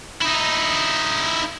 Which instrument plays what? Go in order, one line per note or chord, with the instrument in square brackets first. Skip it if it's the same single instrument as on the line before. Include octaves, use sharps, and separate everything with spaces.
[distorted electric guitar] D#4 E4